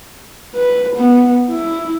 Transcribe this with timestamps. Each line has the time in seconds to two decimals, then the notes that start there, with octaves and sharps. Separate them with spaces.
0.55 B4
0.96 B3
1.51 E4